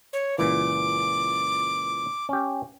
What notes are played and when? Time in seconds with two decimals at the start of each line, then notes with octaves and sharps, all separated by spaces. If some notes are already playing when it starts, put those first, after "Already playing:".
0.13 C#5
0.38 C#2 A#2 E3 D6
2.29 C#4 G4